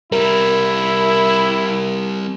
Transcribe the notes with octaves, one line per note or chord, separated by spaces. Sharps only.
G3 C4 E4 A#4